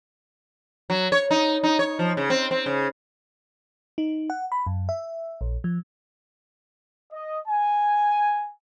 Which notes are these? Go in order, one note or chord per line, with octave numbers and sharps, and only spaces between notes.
F#3
C#5
D#4
D#4
C#5
F3
C#3
C4
C4
C#3
D#4
F#5
B5
F#2
E5
A#1
F3
D#5
G#5